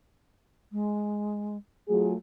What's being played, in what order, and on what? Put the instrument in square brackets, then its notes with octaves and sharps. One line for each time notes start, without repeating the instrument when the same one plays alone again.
[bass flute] G#3
[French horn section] F#3 F4 G#4 [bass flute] A3